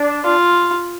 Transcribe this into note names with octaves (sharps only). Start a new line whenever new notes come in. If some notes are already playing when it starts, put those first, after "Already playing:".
Already playing: D4
F4